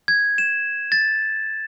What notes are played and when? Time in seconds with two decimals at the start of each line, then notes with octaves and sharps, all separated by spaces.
0.08 G#6
0.38 E7
0.92 A6